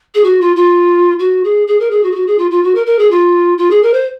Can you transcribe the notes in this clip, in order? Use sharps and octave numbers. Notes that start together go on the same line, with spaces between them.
G#4
F#4
F4
F4
F#4
G#4
G#4
A#4
G#4
F#4
G#4
F#4
G#4
F4
F4
F#4
A#4
A#4
G#4
F4
F4
G#4
A#4
C5